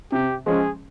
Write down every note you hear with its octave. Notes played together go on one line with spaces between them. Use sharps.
C3 G4
F3 G#3 C#4 G#4